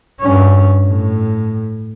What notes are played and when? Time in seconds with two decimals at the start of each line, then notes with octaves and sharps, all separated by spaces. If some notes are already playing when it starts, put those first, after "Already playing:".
0.20 G2 C#4
0.87 A2